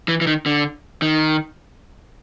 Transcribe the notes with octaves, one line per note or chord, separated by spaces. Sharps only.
E3
E3
D#3
D3
D#3